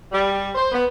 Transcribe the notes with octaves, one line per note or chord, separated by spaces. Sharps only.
G3
C5
B3